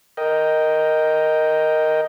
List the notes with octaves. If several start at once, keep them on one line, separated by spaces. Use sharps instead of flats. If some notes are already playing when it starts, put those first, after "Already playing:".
A#4 D#5 G5